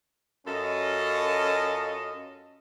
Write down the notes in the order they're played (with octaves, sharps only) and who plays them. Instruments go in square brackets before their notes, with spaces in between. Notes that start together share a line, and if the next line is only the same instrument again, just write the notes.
[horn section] F#2 C#4 F4 A4 D#5